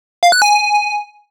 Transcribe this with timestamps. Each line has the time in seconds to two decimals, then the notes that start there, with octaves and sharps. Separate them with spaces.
0.23 F5
0.32 F#6
0.42 G#5